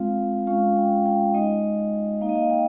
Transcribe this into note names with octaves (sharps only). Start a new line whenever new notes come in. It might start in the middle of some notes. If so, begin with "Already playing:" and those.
Already playing: G#3 C4 F4 F5
G#3 C#4 F4 F5
G5
G5
G#3 D#4 D#5
A#3 D#4 F5
D#5
F5
G5